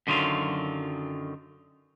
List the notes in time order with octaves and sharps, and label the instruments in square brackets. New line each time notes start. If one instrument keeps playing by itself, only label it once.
[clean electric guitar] F#2 D3 D#3 F#3 F4